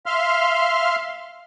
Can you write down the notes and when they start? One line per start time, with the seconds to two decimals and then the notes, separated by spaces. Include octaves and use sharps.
0.06 E5 F5 C6 F6